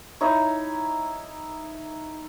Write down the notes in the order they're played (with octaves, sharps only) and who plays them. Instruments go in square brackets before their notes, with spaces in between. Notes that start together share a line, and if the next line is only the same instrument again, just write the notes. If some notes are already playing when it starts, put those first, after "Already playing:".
[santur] D#4 E4 C#5